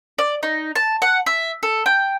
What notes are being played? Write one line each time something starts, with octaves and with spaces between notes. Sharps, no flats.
D5
D#4
A5
F#5
E5
A4
G5